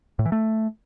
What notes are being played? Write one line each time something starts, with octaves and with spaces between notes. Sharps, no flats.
A2
E3
A3